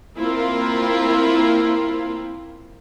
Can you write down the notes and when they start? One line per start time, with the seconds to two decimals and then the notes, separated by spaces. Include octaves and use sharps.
0.17 A#3 C4 E4 F4 A#4